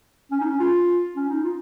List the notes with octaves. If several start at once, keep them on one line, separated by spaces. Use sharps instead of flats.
C#4
D#4
C#4
F4
C#4
D#4
F4